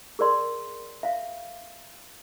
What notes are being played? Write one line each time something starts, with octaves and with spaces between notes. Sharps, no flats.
G#4 A#4 D5 C6
E5 F5